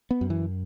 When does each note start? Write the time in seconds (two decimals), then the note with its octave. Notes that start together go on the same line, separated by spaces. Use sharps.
0.11 B3
0.21 F#2
0.30 E3